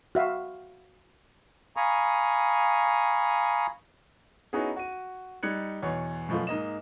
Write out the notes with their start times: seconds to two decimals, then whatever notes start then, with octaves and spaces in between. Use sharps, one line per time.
0.15 F#4 E5 F5
1.77 F5 G#5 A#5 B5 C#6 D#6
4.53 B3 C#4 D#4 E4 F#4 G#4
4.76 F#4 D#7
5.43 G3 D#4 F#6 G#6 C#7
5.82 E2 B2 C#5
6.29 F#2 B2 F3 A3 F4
6.47 G#2 A#3 D#5 E7